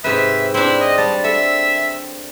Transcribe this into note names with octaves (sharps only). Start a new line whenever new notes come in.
G#2 C3 B4 E5
C4 D4 E4
D#5
G3 A5
A4 E5